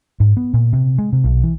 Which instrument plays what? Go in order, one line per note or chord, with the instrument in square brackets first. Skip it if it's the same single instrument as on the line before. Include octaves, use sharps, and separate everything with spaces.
[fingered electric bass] G#2
B3
A#2
C3
G#3
C3
B1
E3